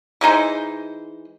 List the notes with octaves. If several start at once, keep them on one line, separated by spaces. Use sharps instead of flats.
E3 G#3 D#4 C5